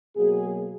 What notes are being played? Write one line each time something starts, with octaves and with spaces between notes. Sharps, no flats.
B2 F#3 A#3 G#4